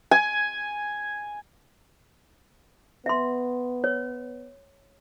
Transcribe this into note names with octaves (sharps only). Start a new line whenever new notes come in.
G#5
B3 E5 C6
C#5